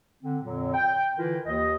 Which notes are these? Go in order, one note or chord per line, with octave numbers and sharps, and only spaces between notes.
D3 C4
F2 A#2 D3 F#3
G5
D3 E3 E4 F4 A#4
D#2 D#5